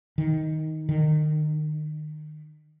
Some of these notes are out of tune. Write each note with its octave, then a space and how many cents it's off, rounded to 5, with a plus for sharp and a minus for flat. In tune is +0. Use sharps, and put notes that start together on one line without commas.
D#3 +10
D#3 -30